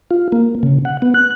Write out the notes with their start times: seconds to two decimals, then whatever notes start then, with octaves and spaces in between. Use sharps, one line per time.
0.11 F4
0.32 A#3
0.63 C#3
0.85 F#5
1.02 B3
1.14 F#6